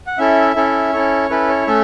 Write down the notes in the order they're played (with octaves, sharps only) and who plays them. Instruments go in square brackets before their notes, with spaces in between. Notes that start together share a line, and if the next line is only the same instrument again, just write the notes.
[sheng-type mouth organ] F#5
C#4 E4 A4 E5
C#4 E4 A4
C#4 E4 A4 C#5
C#4 E4 A4 B4
C#5
A3 C#4 A4 E5